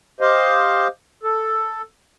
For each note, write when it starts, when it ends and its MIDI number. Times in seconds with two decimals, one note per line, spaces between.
0.20 0.88 67
0.20 0.88 72
0.20 0.88 75
0.20 0.88 77
1.23 1.82 69